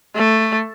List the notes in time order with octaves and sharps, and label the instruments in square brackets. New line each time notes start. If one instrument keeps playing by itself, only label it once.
[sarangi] A3